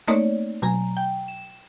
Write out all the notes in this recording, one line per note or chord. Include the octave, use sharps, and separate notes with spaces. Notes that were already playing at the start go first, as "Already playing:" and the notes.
A3 A#3 C4 D#4 C#5 D5
B2 F#3 G#5 A#5
G5
E7